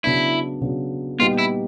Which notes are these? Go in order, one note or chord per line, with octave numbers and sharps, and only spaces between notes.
C#3 F#3 B3 D4 E4
C#3 F#3 B3 D4
A#2 G3 B3 D#4 F4 G4
E4